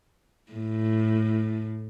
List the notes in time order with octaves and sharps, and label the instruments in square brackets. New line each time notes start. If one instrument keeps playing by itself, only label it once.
[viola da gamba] A2